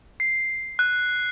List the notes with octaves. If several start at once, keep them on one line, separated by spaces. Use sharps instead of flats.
C7
F#6